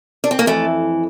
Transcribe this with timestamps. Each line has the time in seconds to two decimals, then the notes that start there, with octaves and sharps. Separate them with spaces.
0.24 D4
0.31 C4
0.39 A#3
0.46 F2 E3 A3